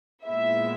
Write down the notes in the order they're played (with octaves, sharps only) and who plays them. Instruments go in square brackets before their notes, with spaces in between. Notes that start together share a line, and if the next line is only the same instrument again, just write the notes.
[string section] A#2 G#3 B3 E4 E5